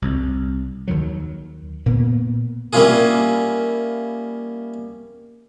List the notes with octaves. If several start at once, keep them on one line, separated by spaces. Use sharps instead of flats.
C2
D#2 D#3 F#3
A#2 A#3 B3
G3 A#3 C#4 E4 F4 G#4